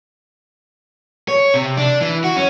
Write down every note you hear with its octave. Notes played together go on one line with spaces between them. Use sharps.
C#5
C3
D4
E3
F#4
C#4